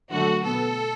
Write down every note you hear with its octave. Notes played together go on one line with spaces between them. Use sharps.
D3 F#3 A3 F#4
B2 B3 A4